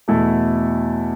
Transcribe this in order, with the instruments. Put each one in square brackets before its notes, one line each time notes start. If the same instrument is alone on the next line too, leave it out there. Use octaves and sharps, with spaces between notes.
[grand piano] E2 B2 A3 E4 A4